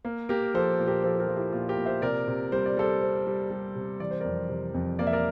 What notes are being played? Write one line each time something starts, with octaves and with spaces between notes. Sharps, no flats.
A#3
A#3 G4 A#4
F3 A4 C5
A#2
G4 A#4
F3 A4 C5
G4 A#4
F3
E4 G4
A#2 F4
G4 A#4
A#2
C5 E5
C3 A#4 D5
C3
G3 C5
D5
G3 A4 C5
C4
G3
G3
C3
E3 D5
C5
F2 A#4 D5
C3
F2
A#3 D5
E5
A#4 D5